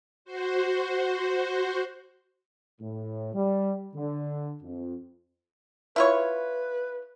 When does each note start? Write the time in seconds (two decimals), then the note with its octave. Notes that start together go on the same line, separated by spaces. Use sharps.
0.25 F#4 C5
2.81 A2
3.34 G3
3.95 D3
4.62 F2
5.96 E4 F4 B4 C#5